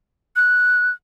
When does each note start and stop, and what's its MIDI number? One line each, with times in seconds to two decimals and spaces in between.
0.36 0.91 90